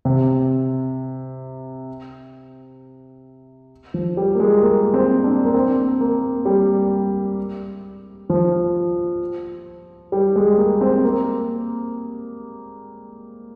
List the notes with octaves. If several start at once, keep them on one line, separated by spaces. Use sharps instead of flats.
C3
F3
G3
A#3
G#3
A#3
C4
D4
A#3
C4
A#3
G3
F3
G3
G#3
A#3
C4
A#3